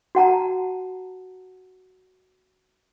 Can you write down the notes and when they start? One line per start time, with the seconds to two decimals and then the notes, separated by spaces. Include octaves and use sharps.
0.15 F#4 F#5 A5 A#5